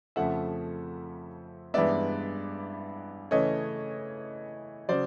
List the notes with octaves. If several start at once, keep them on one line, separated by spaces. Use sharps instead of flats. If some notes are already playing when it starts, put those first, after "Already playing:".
F2 C#3 F3 A3 E5 F#5
G2 E3 G#3 B3 D5 E5
C#3 E3 A3 C#5 D#5
C#3 F#3 C5 D5